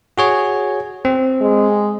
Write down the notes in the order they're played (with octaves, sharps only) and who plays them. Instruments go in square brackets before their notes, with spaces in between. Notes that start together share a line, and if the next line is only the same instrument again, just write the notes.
[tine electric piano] F#4 G#4 C#5
C4
[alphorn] G#3